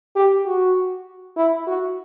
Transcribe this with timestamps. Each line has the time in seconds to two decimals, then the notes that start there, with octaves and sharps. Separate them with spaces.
0.15 G4
0.46 F#4
1.37 E4
1.67 F#4